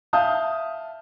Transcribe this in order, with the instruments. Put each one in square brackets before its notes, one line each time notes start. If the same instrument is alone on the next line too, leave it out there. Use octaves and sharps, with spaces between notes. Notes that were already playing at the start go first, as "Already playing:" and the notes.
[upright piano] E5 F5 A5 D#6 G6